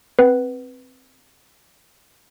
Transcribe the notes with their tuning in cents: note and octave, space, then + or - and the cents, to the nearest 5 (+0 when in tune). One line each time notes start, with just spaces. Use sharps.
C4 +0 B4 +0 F#5 +20